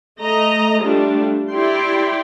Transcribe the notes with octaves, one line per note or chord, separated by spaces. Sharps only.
A3 D#5 A#5
G3 A3 D4 F4
E4 G4 D5 G5 C6